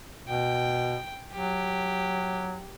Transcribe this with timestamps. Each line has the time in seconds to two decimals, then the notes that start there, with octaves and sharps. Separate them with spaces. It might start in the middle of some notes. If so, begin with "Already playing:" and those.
0.28 B2 G5
1.32 F#3 G4